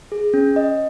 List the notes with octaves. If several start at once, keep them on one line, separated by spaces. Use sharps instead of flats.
G#4
C#4
D#5